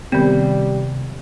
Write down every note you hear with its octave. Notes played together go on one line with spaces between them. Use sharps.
C3 D#3 G3 B3